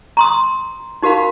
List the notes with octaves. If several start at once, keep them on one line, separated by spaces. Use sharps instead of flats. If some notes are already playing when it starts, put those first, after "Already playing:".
A#5 C6 D#6
D#4 F#4 A#4 F5 B5